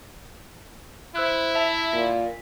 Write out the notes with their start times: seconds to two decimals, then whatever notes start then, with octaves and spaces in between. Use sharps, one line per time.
1.16 E4 C5 E6 F#6
1.55 E5 A5
1.93 A#2 B6